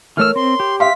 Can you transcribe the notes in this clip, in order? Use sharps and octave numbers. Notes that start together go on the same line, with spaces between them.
E3 A3 A#4 C#5 E6 F6
C4 C6
G4
E5 F5 C6 B6